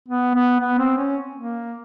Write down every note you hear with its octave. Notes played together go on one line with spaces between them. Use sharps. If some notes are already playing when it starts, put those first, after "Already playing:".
B3
B3
B3
C4
C#4
A#3